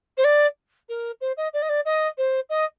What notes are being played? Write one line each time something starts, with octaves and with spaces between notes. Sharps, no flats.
C5
D5
A#4
C5
D#5
D5
D#5
D5
D#5
C5
D#5